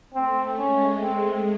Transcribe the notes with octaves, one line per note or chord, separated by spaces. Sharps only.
A3 C4
G#3 C#4
C4